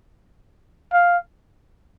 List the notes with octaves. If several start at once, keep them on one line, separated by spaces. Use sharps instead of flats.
F5